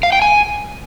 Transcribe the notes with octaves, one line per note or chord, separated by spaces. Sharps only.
F5
G5
G#5